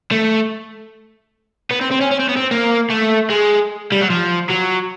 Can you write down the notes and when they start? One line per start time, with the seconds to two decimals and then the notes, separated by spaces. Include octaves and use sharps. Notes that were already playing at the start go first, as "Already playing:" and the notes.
0.11 A3
1.71 B3
1.81 C4
1.91 C4
2.00 C#4
2.11 C#4
2.19 C4
2.28 B3
2.36 C4
2.51 A#3
2.90 A3
3.30 G#3
3.92 G3
4.01 F#3
4.10 F3
4.50 F#3